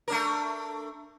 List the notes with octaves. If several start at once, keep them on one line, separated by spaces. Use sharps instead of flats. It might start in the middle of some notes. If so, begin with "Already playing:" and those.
A3 D4 A#4